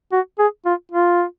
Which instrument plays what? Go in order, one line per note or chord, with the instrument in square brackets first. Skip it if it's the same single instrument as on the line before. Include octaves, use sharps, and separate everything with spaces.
[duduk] F#4
G#4
F4
F4